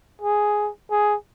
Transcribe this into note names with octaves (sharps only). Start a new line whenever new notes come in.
G#4
G#4